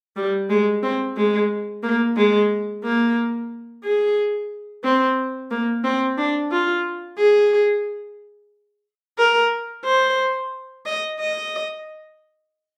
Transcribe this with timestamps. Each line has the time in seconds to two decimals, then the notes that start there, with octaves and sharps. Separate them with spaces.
0.16 G3
0.50 G#3
0.83 C4
1.17 G#3
1.83 A#3
2.17 G#3
2.84 A#3
3.84 G#4
4.84 C4
5.51 A#3
5.84 C4
6.18 D4
6.52 F4
7.18 G#4
9.18 A#4
9.85 C5
10.86 D#5
11.20 D#5